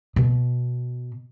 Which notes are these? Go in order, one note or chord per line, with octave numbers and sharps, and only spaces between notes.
B2